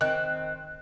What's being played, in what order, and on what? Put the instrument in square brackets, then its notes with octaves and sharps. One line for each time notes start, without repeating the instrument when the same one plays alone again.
[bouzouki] D#3 C4 [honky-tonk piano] F#6